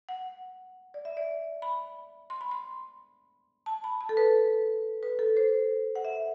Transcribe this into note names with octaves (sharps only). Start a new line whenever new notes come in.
F#5
D5
E5
D5
B5
C6
B5
C6
A5
B5
A5
A4
B4
B4
A4
C5
F#5
E5